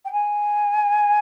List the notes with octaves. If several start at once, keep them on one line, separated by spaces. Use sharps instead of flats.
G5
G#5